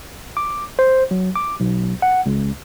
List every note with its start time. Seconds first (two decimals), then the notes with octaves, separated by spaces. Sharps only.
0.37 D6
0.79 C5
1.11 F#3
1.36 D6
1.60 B1
2.02 F#5
2.26 C#2